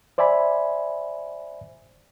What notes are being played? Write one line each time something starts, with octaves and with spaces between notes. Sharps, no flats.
C5 D5 E5 G#5 B5